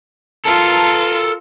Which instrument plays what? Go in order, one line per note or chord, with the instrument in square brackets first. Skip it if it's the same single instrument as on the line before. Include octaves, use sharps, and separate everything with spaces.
[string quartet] F4 [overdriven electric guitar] A4 A#4